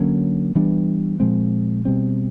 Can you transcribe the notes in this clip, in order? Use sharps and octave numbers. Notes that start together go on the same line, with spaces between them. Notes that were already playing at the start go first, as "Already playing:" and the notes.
Already playing: D3 F#3 A#3 C#4
E3 G3 B3 D4
A#2 F3 G#3 C4
B2 G3 C4